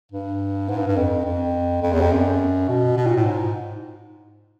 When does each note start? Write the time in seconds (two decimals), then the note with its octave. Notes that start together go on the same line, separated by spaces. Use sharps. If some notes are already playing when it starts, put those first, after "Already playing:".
0.12 G2
0.69 G#2
0.78 G2
0.88 G2
0.97 F2
1.25 F2
1.83 F2
1.93 E2
2.01 F2
2.12 F#2
2.69 B2
2.97 B2
3.06 A#2
3.16 A2
3.25 G#2